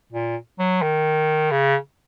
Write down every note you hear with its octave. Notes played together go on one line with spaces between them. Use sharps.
A#2
F#3
D#3
C#3